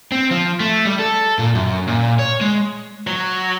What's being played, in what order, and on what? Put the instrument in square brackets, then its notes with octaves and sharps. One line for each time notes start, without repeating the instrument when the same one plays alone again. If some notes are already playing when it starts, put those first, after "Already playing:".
[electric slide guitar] C4
F3
A3
G3
A4
A#2
F#2
A#2
C#5
G#3
[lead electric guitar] F#3